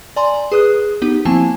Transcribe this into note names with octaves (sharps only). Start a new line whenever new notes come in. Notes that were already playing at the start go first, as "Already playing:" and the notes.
D5 G#5 A#5 C6
G#4 B4 D#6 F#6
B3 D#4 G4
F3 A#3 C4 E4 G#5 A5